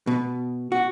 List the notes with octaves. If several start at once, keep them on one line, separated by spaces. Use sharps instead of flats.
B2
F#4